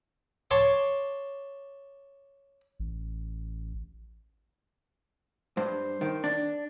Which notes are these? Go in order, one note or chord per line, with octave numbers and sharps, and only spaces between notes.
C#5 A5 C6 D6
A1
G2 C5
D#3
D4